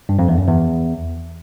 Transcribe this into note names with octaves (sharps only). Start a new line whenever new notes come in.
G2
F2
E2
F#2
E2